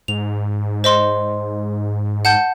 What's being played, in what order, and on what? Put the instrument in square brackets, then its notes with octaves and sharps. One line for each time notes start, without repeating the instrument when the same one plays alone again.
[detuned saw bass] G#2 [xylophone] F7
[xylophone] C5 D#5 C6
F#5 A5 G6